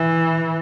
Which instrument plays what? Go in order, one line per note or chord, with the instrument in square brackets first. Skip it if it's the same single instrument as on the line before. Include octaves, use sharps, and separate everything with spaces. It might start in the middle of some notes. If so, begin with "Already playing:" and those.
Already playing: [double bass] E3